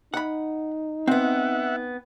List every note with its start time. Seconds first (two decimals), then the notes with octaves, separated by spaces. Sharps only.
0.14 D#4 F#5 B5
1.07 B3 C4 E5 F#5